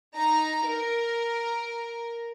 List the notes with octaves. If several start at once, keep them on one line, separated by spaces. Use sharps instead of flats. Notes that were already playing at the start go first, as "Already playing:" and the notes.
D#4 A#5
A#4